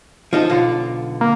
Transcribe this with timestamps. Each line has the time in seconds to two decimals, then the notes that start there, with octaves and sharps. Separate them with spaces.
0.33 F3 D#4 A4
0.50 B1 D3 F4
1.21 A#3